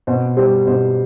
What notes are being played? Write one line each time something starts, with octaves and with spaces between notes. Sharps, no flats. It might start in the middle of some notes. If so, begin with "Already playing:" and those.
B2 C5
G3 C5
B2 C5